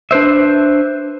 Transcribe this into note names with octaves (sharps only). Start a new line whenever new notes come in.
D4 B4 C5 E5